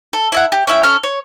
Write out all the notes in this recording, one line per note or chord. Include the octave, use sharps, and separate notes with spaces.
A4
E4 E5 F#5
G4
C#4 E4 E5 G5
C#4 A4 F6
C#5